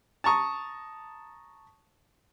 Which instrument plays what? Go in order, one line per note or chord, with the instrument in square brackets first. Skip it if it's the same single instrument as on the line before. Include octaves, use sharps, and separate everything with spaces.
[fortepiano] A5 A#5 C#6 D#6